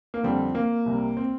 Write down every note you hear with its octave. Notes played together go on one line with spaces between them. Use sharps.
A#3
F2 D3 G3 C4
A#3
C2 C3 G3
C4